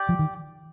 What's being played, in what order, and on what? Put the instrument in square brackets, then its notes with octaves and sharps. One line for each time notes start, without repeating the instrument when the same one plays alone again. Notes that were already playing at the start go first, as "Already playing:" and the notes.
Already playing: [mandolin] G4 D5 G5
[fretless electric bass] F3
D#3